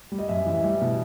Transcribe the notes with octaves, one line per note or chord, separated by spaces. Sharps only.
G3
D#5
F#2 E5
E3
E5
G3
B2